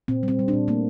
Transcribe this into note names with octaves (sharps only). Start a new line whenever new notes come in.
A#2 C4
G3 C4
G3
D4
A#2
A3 A#3